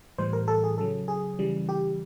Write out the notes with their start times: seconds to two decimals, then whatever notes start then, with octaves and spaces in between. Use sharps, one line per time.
0.18 A2 E3 G3 C5
0.33 A#4
0.48 A4
0.64 G#4
0.78 C#3 F#3 A4
1.08 G#4
1.39 C#3 E3 G3
1.69 G4